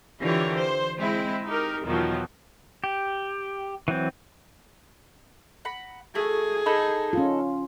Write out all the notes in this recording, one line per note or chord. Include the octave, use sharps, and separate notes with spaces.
D3 E3 F4 G4 A#4 C#5
C5
G#3 C4 E4
D#4 G4 A#4
E2 B2 D#3 F3 F#3
G4
E3 F#3 C4
F#5 A#5 B5
A3 F#4 G#4
D#4 A4 B5
C#4 F4